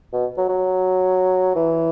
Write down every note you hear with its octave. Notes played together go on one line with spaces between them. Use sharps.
B2
F#3
F#3
E3